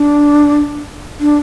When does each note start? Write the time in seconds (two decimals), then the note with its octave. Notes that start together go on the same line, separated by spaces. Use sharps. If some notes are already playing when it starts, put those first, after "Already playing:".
Already playing: D4
1.20 D4